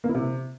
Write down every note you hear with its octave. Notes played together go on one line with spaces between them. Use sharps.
A#3
E4
C3